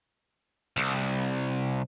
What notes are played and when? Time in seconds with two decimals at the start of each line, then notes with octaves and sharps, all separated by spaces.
0.77 C2